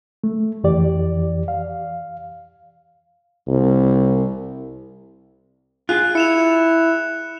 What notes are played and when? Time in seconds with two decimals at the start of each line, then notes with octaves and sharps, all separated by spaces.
0.24 A3
0.64 F2 E3 G4 D5
1.48 F5
3.48 C2
5.89 F4 G#4 F#6
6.15 E4 C#7 E7 F7